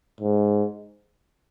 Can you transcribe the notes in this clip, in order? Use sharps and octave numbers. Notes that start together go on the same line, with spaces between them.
G#2